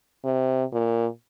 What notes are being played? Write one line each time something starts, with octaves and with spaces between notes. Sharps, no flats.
C3
A#2